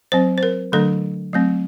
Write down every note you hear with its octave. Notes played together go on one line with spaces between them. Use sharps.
F#3 C4 C5
C5
A#4
D3 F#3 A3 D4 A4
F#3 A3 C4